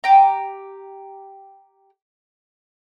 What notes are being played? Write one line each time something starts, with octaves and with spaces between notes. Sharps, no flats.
G4 A#5